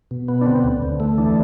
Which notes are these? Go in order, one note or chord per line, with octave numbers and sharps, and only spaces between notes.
B2
B3
D4
D3 C4
D2
D2
A3
E3 D4